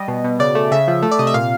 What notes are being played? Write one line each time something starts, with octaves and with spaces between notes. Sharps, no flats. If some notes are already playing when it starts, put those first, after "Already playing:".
Already playing: G3 D#5
B2
B2
C#3 D5
A3
C#3 E5
F3
A3
D5
C3 D#5
E5
A#2 F5